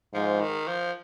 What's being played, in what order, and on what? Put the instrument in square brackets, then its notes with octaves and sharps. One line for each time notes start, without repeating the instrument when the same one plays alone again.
[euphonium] G#2 [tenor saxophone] F3
[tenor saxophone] D#3
F3